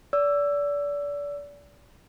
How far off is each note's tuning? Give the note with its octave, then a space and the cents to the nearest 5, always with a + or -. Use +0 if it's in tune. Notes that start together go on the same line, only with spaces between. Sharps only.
D5 -30 E6 +15